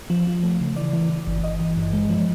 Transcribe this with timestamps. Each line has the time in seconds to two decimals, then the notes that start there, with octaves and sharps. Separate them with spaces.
0.10 F3
0.27 F3
0.43 A3
0.61 C#3
0.76 E3 D5
0.93 E3
1.10 E3
1.27 G1
1.43 G1 D#5
1.60 E3
1.77 G2
1.93 G#3
2.09 F3